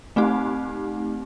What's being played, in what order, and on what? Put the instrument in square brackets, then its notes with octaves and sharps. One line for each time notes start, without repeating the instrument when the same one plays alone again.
[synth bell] A3 C4 D#4 G4